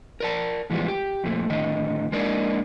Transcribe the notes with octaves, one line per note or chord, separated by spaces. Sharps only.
A#4 D5 A5
A2 E3 F3 G3 G#3 B3
G4
F2 A#2 A3
A2 D3 D#3 D#5
G#3 A#3 D4 D#4 A#4 D5